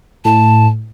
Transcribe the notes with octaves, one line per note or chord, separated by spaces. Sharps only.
A2 A5